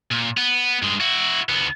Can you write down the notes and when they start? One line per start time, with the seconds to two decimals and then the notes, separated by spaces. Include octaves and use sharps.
0.11 A#2
0.37 B3
0.82 G2 G#3
1.00 E4 F#4
1.49 D2 B3